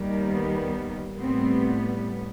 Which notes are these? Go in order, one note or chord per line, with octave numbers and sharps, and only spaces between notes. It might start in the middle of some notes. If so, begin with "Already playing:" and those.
Already playing: D#2 D#3 G3
B3
A2 G3 B3 C4